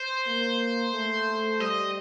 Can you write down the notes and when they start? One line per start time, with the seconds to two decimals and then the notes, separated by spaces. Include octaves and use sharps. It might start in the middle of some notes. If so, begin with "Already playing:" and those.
Already playing: C5
0.27 A#3
0.94 A3
1.60 G3 D#5